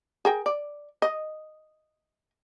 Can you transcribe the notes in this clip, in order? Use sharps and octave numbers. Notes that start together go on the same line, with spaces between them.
G#4 A#4 G5
D5
D#5